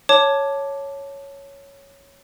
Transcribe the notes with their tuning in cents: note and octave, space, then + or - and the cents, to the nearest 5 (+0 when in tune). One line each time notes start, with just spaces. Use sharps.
C#5 +0 A5 +0 D6 +0